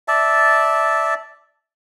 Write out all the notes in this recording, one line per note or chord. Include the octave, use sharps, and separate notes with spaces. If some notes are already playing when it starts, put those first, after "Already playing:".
D5 E5 A5